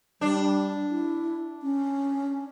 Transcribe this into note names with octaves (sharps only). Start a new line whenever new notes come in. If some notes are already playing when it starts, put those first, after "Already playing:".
G3 D4
E4
C#4